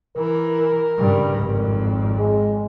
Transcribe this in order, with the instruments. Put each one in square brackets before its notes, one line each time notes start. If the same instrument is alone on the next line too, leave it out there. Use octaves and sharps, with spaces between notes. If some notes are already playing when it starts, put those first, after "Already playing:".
[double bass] E3 [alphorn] A#4
[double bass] G2 C#3
G#1 F2
[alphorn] G#3